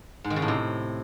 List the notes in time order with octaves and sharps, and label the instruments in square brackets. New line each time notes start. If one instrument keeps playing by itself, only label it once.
[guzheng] G#2
D#3
C#3
A2
C3